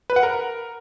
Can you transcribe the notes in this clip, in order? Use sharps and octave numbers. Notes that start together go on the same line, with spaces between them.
B4
F#5
A#4